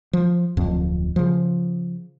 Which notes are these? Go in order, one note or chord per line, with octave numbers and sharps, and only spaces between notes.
F3
D1 F2
C#3 F3